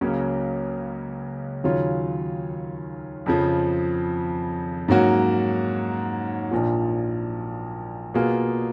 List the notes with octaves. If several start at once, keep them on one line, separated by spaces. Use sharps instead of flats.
C#2 C#3 F#3 A#3 C#4
D#2 C#3 F#3 C#4 F4
F2 C#3 F3
G#2 F#3 A#3 C#4 F#4
A#1 A#2 F3
B2 A#3 F4 G#4